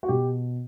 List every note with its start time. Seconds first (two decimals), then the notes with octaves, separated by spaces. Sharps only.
0.03 F#4
0.08 B2 G4